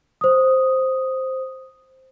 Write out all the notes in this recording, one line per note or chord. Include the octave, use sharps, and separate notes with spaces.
C5 D#6